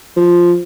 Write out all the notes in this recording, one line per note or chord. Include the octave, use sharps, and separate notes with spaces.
F3